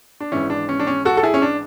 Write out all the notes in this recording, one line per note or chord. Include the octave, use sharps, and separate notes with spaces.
D4
G#1 G#2 E3 C#4 E4
D4
C#4
D4
C#4
F#4 A4
A4
E4 G#4
C#4
D4